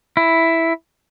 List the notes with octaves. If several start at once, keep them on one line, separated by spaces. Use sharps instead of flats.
E4